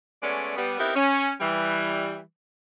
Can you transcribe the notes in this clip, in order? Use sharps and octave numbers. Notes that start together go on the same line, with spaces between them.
G#3 A3 B3 C#4 D5
G3 B3
B3 C4 D#4 E4 G4 A#4
C#4
E3 G3